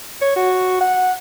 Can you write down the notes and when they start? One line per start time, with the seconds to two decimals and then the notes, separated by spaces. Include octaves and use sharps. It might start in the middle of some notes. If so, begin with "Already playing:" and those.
0.22 C#5
0.36 F#4
0.81 F#5